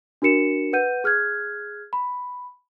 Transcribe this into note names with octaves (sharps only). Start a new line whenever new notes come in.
D4 F#4 A#4 C#7 E7
B4 F#5 G6 D#7
G#4 F6 F#6 G#6
B5